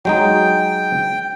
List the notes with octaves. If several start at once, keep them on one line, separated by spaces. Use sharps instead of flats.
F#3 G#3 D#4 G5